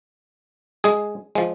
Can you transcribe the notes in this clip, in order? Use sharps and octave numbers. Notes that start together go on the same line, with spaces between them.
G#3 G#4
F3 G#3